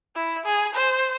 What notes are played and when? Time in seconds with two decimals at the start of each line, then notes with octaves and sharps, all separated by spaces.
0.16 E4
0.45 G#4
0.74 C5